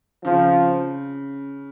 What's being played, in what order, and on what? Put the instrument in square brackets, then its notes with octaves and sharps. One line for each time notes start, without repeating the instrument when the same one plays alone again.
[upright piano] C#3 [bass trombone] F3